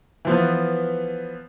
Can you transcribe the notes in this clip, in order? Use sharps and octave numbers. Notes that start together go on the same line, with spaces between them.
E3 F3 B3